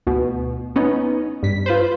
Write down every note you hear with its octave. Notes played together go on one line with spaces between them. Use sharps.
D2 B2
B3 C#4 D#4
G2 B6
F4 B4 C5